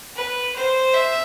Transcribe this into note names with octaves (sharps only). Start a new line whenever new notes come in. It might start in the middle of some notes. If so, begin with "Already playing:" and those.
B4
C5
E5